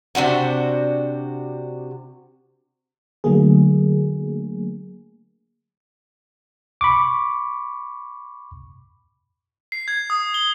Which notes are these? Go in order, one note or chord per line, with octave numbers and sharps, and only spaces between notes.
C3 D4 F#4 C5
D3 F#3 A3 A#3 G#4
B5 C#6 D6
C7
G#6
D#6
G7